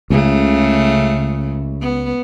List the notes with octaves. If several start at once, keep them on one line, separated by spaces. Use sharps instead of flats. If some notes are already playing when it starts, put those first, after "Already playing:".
C#2 C#3 A3
B3